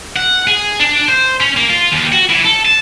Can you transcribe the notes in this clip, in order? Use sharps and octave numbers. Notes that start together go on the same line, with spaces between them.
F#5
G#4
D4
C5
C#4
A#3
F4
D#2
F#4
E3
A4
A5